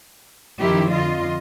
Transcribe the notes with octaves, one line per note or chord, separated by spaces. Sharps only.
F#2 D#3 F3 E4 G4
F2 D3 F4 D#5